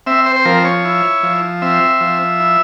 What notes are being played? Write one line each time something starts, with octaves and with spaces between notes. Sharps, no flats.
C4 E5
C5
C5
F3 A#4
C#5
E4
F3
C4 E5
F3
E4